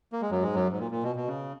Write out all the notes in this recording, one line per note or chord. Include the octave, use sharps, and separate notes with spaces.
A#3
G#3
F#2 F#3
G#2 G#3
F#2 F#3
G#2
A#2
A#2
B2
B2
C#3